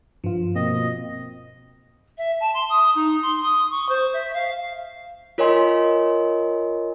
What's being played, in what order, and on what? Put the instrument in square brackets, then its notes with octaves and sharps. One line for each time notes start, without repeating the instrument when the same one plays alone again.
[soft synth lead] G2 [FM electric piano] F3 F4
[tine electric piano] B2 A#3 C4 [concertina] D#5
[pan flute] E5
A5
C6
D#6
D#4
C6
D#6
C#6
C5
E5
F5
[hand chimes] F4 A#4 C#5 D#5 G#5 C6